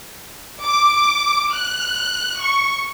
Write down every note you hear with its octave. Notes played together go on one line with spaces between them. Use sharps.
D6
F#6
C#6